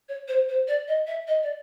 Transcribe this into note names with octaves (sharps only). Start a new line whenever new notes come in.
C#5
C5
C5
D5
D#5
E5
D#5
D5